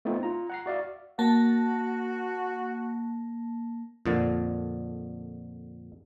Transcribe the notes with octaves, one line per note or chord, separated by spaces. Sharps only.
A3 B3 C4 D#4 F4
F4 A#5
F#5 A#5 C7
F#4 D5 E5 F5
A#3 F#4 A5
F2 A#2 D3